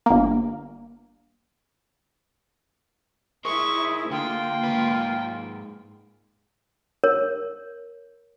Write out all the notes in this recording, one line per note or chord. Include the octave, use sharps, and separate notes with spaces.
G1 A#3
G#3 E4 A#4 C5 G#5 C#6 D#6
D3 A#3 F4 G5
G#2 B4
A#4 C#5